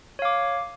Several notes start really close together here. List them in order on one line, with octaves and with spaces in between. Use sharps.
C#5 F5 D6